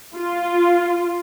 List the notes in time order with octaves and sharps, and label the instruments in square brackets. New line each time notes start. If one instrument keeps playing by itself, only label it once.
[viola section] F4